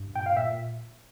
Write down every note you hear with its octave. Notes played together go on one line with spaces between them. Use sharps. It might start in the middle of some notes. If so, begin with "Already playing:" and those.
Already playing: G2
A#2 G5
F5
A#2 E5